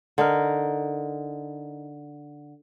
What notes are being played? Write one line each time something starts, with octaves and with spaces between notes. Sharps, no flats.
D3 D#4 A#4